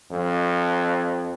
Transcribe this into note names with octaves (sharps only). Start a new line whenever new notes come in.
F2